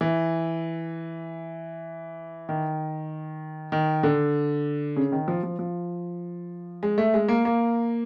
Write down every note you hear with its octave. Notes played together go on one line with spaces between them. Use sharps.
E3
D#3
D#3
D3
C#3
D#3
F3
F3
F3
G#3
A3
G#3
A#3
A#3